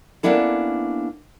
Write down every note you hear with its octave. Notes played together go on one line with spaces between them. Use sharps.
A#3 B3 C#4 D4 E4 A4